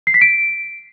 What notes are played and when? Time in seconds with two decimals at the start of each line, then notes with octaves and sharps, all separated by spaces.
0.07 C7
0.14 B6
0.21 D7